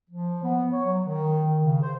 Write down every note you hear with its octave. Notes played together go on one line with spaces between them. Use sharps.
F3
B3
C#5
F#3
D#3
C#3
C5